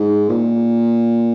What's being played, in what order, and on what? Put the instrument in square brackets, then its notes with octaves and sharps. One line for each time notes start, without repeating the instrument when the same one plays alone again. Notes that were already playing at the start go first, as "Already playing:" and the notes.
Already playing: [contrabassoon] G#2
A#2